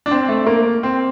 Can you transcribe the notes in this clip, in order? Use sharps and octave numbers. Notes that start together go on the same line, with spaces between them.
D4
C4
A3
A#3
C4